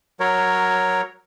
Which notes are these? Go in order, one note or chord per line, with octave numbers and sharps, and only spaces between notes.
F#3 A#4 C#5